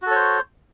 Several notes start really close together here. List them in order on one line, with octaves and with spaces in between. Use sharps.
F#4 A4 C#5 C5